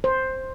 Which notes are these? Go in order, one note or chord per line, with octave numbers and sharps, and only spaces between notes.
C5